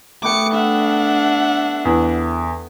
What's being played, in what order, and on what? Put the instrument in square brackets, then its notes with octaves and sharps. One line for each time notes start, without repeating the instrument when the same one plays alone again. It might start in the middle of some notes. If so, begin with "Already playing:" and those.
[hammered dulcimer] A3 B3 G5 [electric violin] D6 C#7
[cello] D4 [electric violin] E5 F#5
[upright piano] E2